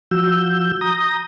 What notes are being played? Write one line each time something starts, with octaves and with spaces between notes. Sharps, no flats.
F3 F#4 E6 G6
A#5 D#6 G6 A#6